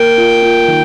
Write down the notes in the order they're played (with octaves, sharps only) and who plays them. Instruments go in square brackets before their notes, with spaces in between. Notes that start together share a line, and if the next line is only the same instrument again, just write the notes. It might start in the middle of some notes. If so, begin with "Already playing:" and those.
Already playing: [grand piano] A#3 [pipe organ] G5
[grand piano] F4
F4
D#3